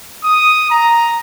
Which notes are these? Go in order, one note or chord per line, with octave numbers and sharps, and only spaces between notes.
D#6
A#5